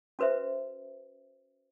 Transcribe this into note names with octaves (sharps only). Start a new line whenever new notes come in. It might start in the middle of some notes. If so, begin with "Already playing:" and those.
C#4 F#4 B4 C5 E5